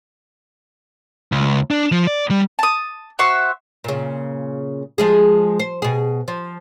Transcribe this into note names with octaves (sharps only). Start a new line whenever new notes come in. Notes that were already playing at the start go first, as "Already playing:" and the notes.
C#2
D4
F3
D5
G3
A5 D#6
F#4 C5 E5 C#6
A#2 C#3
F3 G#3 G#4
C5
B2 G#4
F3